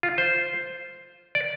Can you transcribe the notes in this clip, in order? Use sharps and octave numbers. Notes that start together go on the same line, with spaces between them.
F4
C5
D5